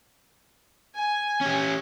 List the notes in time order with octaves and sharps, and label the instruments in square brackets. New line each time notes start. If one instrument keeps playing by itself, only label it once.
[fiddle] G#5
[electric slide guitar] C#4 G4